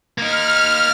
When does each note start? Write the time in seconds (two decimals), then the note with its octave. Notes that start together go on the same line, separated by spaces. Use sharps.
0.18 A#3 D#4 F6